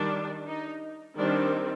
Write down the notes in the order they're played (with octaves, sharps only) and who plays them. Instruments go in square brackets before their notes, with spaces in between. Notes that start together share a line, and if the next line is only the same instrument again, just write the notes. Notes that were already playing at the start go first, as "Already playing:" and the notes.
Already playing: [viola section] D#3 G3 D4
D#4
D#3 G3 C4 D4